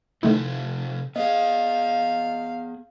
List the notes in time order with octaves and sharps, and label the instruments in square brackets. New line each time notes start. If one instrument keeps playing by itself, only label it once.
[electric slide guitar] C3 F3 A4 [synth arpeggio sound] D#3 A3 E4
[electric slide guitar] B3 G#4 [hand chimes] D#5 [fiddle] F5